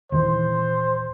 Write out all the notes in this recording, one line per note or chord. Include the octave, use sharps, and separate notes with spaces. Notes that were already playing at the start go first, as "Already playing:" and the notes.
D#1 D#3 E3 C5